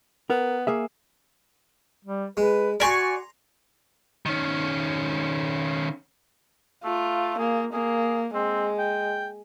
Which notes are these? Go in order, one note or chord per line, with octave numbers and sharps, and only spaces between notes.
B3 A#4
A#3 G#4 E5
G3
G#3 B4
F#4 D5 G#5 A#5 C6 C#6
D#3 C#4
A3 F4
A#3 G#4
A#3 G#4
G#3 C4
G5